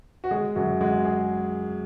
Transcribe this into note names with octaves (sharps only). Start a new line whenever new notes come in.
F#4
G#3 G#4
F#2 F#4
G#3 F#4
G#4